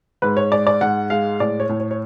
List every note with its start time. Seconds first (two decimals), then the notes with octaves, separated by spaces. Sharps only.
0.22 G#2 B4
0.37 C#5
0.52 G#3 D5
0.67 D5
0.81 G#2 F#5
1.10 G#3 F5
1.40 A2 D5
1.60 C#5
1.69 A2
1.80 C#5
1.91 C#5